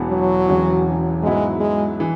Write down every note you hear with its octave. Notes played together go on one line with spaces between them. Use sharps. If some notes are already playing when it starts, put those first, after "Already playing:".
Already playing: E1 E2 E3 B3
F#3
E1 E2 E3 C#4
G#2 F#3 G#3 B3 E4
G#3
E3